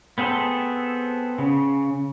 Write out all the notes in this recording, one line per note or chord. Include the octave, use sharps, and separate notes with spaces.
B3 C4 G#4 A4
C#3